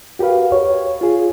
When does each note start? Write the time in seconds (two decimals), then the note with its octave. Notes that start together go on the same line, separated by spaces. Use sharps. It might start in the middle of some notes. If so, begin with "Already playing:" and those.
0.19 F#4 G4 A#4 B4 F5
0.52 C#5
1.01 F4 G#4